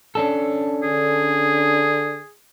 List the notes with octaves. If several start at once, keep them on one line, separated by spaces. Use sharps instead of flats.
C#4 D4 A4
D3 G#4